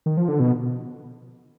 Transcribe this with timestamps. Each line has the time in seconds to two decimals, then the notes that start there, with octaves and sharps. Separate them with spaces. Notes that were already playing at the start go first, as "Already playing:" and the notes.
0.06 D#3
0.17 F3
0.28 D3
0.40 B2